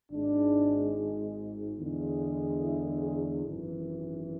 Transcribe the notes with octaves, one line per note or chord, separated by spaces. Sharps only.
G#1 G#2 G#3 D4
E2 D3 G#3
E4
G#4
G#1 F#2 E3